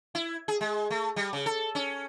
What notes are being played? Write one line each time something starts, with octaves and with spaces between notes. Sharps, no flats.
E4
G#4
G#3
A3
G3
C#3
A4
C#4